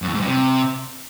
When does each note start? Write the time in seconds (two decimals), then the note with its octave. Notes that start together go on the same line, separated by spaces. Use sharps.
0.02 F#2
0.08 E2
0.14 G#2
0.21 G2
0.27 C3